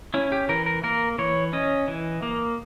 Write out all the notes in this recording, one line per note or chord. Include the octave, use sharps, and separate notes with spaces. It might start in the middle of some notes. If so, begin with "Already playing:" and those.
C#4 E4
G4
E3 A#4
A#4
A#3 A#4
E3 C#5
C#4 D#5
E3
A#3